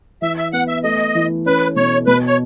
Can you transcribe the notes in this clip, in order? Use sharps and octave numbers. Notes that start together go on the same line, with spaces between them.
E3 E5
E5
B3 F#5
E5
A3 D#5
E3
C#4 B4
B2 C#5
B2 B4
C#5